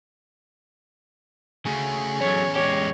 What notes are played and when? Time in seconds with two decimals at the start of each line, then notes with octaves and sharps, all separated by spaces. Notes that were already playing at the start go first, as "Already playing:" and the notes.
1.66 C#3 A3 F#4 G#4
2.21 E2 F#3 A3 C#4 C#5
2.55 G#3 G4 C#5